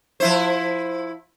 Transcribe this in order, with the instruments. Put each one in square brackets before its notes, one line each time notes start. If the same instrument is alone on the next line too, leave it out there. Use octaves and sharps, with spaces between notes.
[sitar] F3 E4 C5